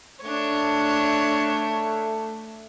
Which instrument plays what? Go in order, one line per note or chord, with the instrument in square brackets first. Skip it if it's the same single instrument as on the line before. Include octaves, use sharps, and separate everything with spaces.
[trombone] A3 [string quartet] D4 C#5